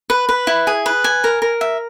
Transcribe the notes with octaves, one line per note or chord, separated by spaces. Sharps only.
B4
B4
E4
G#4
B4
G#5
A#4
A#4
E5